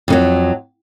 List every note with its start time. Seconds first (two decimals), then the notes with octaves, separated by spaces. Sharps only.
0.08 F2 D#3 F#3